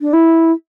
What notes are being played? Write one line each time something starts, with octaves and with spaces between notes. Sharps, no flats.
D4
E4